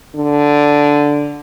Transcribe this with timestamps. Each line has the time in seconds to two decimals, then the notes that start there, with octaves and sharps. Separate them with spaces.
0.16 D3